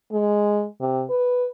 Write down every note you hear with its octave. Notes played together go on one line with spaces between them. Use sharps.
G#3
C3
B4